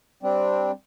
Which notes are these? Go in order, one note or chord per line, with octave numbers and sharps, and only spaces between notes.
G3 C4 D4